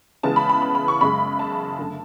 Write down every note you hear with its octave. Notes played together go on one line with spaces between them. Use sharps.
C#3 E3 G#3 B3 A5
B5
B5
B5
B5
C#6
F#2 C#3 G#3 B5
A5
F#2 D3 A3